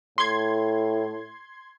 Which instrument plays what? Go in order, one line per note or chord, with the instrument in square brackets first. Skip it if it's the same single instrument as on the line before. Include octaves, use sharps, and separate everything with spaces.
[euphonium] A2 [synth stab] C6 G#6